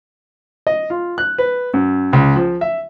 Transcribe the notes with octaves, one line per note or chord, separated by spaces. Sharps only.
D#5
F4
F#6
B4
F#2
C#2
F3
E5